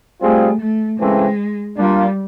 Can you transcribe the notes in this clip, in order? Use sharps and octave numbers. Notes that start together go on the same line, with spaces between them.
G3 A3 C4 F4 G#4
A3
C#3 E3 G#3 A3 C4
G3 A#3 D4 F4 A#4